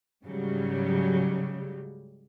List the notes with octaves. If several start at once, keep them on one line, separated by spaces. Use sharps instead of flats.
G#2 C#3 F#3 G3